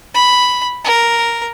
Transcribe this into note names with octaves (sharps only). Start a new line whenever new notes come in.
B5
A#4